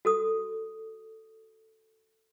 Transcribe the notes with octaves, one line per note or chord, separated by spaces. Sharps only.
F#4 A4 D#6